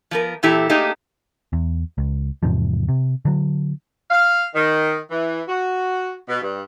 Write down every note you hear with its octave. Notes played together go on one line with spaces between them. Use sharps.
F3 B3 A#4
A#2 E3 E4 G4 A4
A3 A#3 D4 D#4 G4 G#4
E2
C#2
E2 G#2 C3 F3
C3
D3 F#3
F5
D#3
E3
F#4
B2
G2